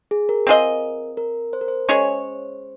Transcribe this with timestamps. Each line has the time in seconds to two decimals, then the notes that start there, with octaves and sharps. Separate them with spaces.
0.11 G#4
0.29 A#4
0.47 C4 F4 G#4 D#5
1.17 A#4
1.53 C5
1.61 A#4
1.68 C5
1.89 G#3 C#4 G#4 C#5